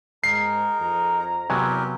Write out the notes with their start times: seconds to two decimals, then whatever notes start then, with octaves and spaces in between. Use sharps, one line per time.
0.24 G#2 D#4 G#4 A#4 C7
0.79 F2 A#5
1.50 E2 C3 F#3 B3 G4 A#4 B4 G#5